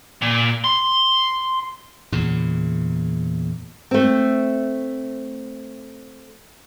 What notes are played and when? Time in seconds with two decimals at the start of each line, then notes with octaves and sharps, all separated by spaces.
0.22 A#2
0.64 C6
2.12 E2 A#2 C#3
3.91 A3 C4